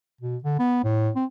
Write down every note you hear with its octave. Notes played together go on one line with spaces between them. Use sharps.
B2
D3
B3
A2
C4